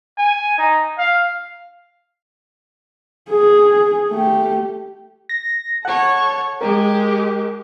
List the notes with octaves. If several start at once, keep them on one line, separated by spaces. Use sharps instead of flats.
G#5
D#4
F5
G#4
A3 G4
A#6
A4 C#5 F#5
G#3 G4 A#4